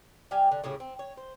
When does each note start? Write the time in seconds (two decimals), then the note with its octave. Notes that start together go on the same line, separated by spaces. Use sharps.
0.31 G3 G4 F5 G#5
0.51 D3
0.64 A2 C#3 G4 G#4
0.80 C4
0.99 C#5
1.17 C5